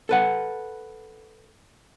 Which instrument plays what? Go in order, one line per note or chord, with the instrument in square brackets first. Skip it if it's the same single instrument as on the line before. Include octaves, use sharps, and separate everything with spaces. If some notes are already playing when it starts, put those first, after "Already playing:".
[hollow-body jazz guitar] A4 B4 F#5